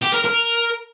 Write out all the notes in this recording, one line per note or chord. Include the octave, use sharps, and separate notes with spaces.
G4
A#4
A#4